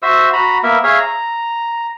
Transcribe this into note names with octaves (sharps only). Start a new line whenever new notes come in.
F#4 C5 E5 E6
F#4 A#5 B5
A#3 B3 A#4 E5
G#4 C#5 E5 F5
A#5